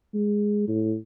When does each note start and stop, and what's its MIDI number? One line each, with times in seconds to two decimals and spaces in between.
0.14 0.67 56
0.68 0.95 45